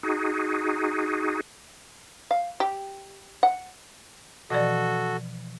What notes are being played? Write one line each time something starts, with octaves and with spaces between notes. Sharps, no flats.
D#4 F#4 G#4
F5
G4
F#5
B2 E3 F3 F#4 A4 D5 D#5